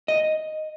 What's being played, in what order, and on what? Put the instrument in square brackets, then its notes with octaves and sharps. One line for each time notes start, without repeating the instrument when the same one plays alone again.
[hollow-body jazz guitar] D#5